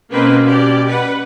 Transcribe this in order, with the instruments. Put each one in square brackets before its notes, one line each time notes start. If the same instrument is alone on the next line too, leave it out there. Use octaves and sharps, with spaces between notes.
[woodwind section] B2 C#4 [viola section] A#3 C4 B4
[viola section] G4 D5
B4 F#5